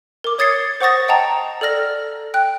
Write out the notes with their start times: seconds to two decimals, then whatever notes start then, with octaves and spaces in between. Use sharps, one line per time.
0.24 A#4 D6
0.38 C#5 D#6 G#6 A6 C7 C#7
0.81 C5 F#5 C#6 D#6 A6 A#6
1.08 D#5 F#5 G5 A5 A#5
1.61 A4 D5 F6 A#6
2.34 G5 F#6